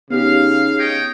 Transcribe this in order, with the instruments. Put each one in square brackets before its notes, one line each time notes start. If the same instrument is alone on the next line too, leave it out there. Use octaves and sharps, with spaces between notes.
[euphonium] C#3 [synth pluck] B3 D#4 G4 [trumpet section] F5
[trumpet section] C#5 D#5 G5